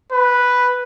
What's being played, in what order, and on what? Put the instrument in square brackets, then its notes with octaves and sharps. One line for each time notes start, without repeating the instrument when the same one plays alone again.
[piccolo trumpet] B4